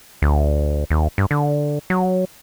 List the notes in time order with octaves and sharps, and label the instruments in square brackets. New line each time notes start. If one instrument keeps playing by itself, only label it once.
[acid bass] D2
D#2
G2
D3
F#3